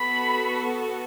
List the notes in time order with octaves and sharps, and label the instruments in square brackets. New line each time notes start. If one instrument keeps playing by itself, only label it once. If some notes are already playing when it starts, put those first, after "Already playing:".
Already playing: [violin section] B3 F#4 A4 B5